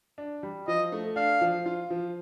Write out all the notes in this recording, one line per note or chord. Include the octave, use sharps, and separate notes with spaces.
D4
G3
F3 D#5
A3
D4 F5
F3
F4
F3